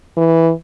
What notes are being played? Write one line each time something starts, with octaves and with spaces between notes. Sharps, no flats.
E3